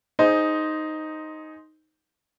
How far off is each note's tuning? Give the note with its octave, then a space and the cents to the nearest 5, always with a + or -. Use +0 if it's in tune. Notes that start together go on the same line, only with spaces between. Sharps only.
D#4 +0 G#4 +15 C5 +0